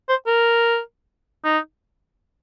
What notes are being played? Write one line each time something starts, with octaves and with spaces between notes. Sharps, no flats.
C5
A#4
D#4